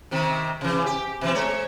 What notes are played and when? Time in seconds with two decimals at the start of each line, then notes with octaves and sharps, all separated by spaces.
0.11 C3 D#3 C4
0.61 C3 E3
0.86 G4
1.21 B2 E3 C4
1.35 G#3 C#5